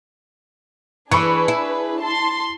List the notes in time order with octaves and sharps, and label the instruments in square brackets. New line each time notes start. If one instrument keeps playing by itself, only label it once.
[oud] E3 [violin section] D4 G#4 B4 [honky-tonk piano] B5 C#6 C#7
[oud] E4
[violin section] A5 C6